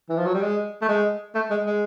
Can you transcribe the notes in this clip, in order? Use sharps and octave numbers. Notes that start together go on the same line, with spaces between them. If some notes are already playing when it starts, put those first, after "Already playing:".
E3
F3
F#3
G3
G#3
A3
G#3
A3
G#3
G#3